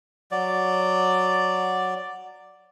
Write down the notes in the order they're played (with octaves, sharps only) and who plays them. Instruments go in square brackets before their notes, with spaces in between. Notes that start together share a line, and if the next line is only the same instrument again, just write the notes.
[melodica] F#3 D5